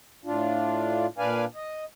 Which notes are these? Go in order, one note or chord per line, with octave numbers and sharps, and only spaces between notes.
A2 D4 F4
A#2 D4 B4 D5 F5 G#5
D#5